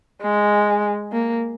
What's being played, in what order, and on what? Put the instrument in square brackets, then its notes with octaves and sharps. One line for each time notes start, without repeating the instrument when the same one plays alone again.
[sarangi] G#3
A#3